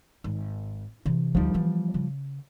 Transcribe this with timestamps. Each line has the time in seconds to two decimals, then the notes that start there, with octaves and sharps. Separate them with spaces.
0.24 G#1
1.06 C3 E3
1.35 D2 F3 G3 D#4
1.54 E3 B3
1.94 C#3